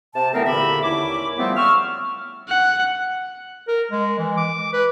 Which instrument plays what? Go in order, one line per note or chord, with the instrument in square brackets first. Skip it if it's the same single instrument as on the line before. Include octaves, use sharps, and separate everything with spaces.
[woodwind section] C3 A5
D3 E3 A3 B3 C4 A#4
E2 A#2 D3 G4 E5 B5
D#2 C#4 E4 D6
C#3 F3 G3 A3 B3 C4
C#6 E6 F6
[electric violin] F#5
[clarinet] A#4
G#3
E3
D6
B4